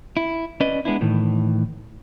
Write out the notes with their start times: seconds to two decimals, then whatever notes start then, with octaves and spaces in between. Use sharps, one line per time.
0.17 E4
0.60 C#4 B4 D5 D#5
0.85 G#3 B3 D4 E4
1.01 A2 D#3 E3